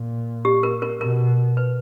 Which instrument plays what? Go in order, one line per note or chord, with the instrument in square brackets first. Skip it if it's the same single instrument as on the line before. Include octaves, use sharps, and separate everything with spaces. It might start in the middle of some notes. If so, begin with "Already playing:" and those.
Already playing: [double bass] A#2
[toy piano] G4
A#4
A#4
[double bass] B2 [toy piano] A#4
[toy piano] B4